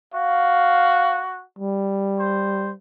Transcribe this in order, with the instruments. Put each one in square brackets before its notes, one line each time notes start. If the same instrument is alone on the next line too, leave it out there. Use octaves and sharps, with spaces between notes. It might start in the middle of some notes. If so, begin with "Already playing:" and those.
[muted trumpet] F#4 [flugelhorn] F5
[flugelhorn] G3
[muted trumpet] C5